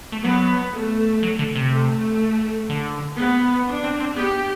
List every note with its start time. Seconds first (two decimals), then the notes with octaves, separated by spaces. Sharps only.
0.12 A3
0.24 F#3 B3
0.74 A3
1.23 F#3
1.39 D3
1.55 C3
1.72 A3
2.70 D3
3.19 B3
3.67 D4
3.84 C4
4.00 C4
4.16 B3 G4